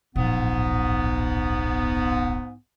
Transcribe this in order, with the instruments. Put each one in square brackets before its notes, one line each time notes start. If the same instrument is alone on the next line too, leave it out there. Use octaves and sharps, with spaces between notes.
[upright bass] D1 A#1 [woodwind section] G#2 B3